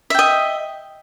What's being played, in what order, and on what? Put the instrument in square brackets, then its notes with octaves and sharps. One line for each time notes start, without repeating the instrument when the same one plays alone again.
[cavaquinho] E5
G5
D#5